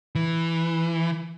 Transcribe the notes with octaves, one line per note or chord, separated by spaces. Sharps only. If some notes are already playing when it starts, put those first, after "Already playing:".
E3